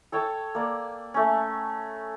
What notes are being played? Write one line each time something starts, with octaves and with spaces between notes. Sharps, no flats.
A4 C#5 G5 A5
A#3 D5
A3 C#4